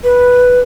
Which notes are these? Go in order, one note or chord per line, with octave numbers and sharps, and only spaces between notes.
B4